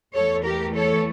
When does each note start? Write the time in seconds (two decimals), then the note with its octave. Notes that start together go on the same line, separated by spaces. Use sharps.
0.13 E2 E3 A3 A4 C#5
0.44 G4 A#4
0.74 A4 C#5